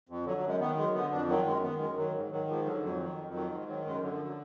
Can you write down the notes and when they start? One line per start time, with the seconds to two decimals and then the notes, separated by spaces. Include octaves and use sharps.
0.09 F2
0.25 D3 F#3
0.37 F#3
0.43 F#2
0.48 G#3
0.60 D#3 B3
0.77 F#2 G#3
0.94 D3 B3
1.11 F2 D4
1.28 D#3 F#3
1.45 F#2 G#3
1.63 D#3 B3
1.79 F#2 G#3
1.97 D#3 F#3
2.14 G#2
2.31 D#3 F#3
2.48 G#2 F3
2.65 D3 F#3
2.83 F2 F#3
3.00 D#3
3.17 F2
3.34 D#3 F#3
3.52 G#2
3.68 D#3 F#3
3.85 F#2 G#3
4.02 D3 F#3
4.14 F3
4.25 F#3